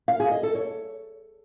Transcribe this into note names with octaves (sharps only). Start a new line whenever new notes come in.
F5
G#4
D#5
A4
C#5